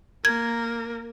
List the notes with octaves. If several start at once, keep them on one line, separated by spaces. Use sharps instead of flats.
A#3 A#4 G#6